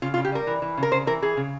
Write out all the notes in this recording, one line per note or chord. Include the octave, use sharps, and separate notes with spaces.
C#3 F4
F4
C#3
G4
G3 A#4
E3
E3
C#3
A#4
C#3 C5
E3 A#4
E3 G#4
C#3